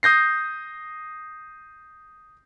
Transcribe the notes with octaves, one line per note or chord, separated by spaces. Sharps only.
D#6 G6 A#6 C7